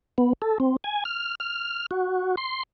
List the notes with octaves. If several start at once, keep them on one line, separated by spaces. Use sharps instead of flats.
B3
A4
C4
G#5
F6
F6
F#4
C6